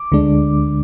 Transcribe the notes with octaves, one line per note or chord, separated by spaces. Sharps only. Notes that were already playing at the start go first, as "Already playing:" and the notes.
Already playing: D6
D2 D3 G#3 D4